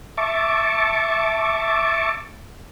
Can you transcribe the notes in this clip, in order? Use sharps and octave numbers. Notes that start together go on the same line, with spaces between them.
E5 A5 C#6 D6